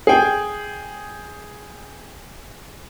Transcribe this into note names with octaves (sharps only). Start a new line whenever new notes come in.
G#4 G5